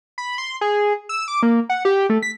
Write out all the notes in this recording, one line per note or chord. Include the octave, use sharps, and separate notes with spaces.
B5
C6
G#4
E6
D6
A#3
F#5
G4
A3
B6